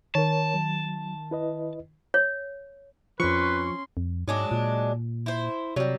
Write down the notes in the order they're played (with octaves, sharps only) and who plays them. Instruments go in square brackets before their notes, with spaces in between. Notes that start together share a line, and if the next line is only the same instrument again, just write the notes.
[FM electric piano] D#3 [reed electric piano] A#4 C#5 [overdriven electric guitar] A5
[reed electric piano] F#3
E4 B4 D#5
[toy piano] C#5
[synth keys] F2 C#6 [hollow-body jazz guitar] F3 [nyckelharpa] C#4 C6 [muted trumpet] B4
[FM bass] F2
[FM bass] G#2 [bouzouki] F#3 G#3 D4
[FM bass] A#2
[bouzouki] E4 C5
[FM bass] C3 [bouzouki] F#3 G3